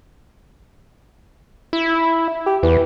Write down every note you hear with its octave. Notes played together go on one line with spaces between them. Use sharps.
E4
G4
E2 E3